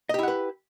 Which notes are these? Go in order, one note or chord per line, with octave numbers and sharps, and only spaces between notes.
E4 G4 B4 D#5 F#5